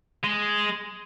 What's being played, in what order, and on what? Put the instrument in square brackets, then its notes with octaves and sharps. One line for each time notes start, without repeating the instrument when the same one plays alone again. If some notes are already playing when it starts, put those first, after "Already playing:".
[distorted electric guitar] G#3